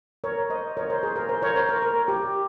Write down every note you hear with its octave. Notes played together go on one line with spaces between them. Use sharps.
A#4 C#5
C5 D#5
A#4 C#5
C5
G#4
A#4
C5
A#4 C#5
C5
A#4
A#4
G4